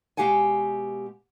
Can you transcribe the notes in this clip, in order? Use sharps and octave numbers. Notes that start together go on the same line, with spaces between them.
B2 G#3 G4 F5 F#5 G#5